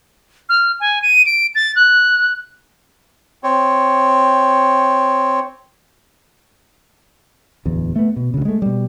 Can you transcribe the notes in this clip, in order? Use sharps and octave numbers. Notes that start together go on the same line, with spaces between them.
F6
G#5
D#7
D7
A6
F#6
C4 C#5
D1 E2
A3 B3
B2
D2 C#3
G#3 A3
B2 G3